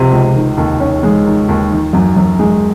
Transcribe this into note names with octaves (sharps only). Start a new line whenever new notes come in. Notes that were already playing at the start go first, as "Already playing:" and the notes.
Already playing: C#2 C3 F3
C#2
D#3
D#2
C#4
G#3
D#3
D#2
D#3
F#2
F#2
G#3